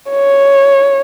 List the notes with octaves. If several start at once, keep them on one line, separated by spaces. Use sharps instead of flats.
C#5